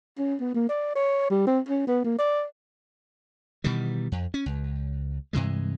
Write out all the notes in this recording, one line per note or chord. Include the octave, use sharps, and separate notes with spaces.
C#4
B3
A#3
D5
C#5
G3
C4
C#4
B3
A#3
D5
B2 D#3 E3 G3
F2
C#4
C#2
G2 C3 E3 G#3